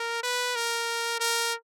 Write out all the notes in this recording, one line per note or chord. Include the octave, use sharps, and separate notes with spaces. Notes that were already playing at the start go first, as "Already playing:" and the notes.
Already playing: A#4
B4
A#4
A#4